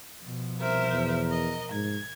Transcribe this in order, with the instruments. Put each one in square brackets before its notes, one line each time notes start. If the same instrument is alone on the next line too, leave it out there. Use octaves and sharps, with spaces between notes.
[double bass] B2 F3
[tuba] C2 [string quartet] A#4 C5 E5
[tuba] E2
[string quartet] A#4 D#5
[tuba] G#2 [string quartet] G#6